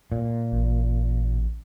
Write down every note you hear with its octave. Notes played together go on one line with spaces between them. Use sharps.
A#2
A1